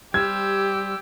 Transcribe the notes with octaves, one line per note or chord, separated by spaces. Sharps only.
G3 G4 C5 E6 F6 G#6